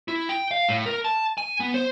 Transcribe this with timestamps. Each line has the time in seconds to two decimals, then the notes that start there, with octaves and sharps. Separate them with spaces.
0.08 E4
0.29 G5
0.51 F5
0.69 A2
0.86 A#4
1.05 A5
1.38 G#5
1.60 B3
1.74 C5